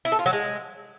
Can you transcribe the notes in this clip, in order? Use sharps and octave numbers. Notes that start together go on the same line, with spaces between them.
E4
A4
F4
F#3
G#3